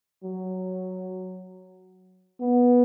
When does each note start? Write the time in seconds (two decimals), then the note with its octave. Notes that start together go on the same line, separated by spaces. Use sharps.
0.23 F#3
2.40 B3